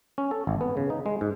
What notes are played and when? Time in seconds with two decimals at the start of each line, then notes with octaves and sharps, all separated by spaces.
0.18 C#4
0.31 A4
0.47 G#1
0.61 B3
0.77 C#3
0.90 D#4
1.06 G#3
1.21 G#2